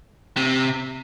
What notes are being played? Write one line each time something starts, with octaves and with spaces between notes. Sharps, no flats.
C3